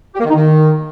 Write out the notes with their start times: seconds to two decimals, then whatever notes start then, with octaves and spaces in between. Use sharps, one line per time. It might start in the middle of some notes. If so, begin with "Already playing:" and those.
0.14 G4
0.19 A#3
0.25 D#3
0.30 D#4
0.35 D#3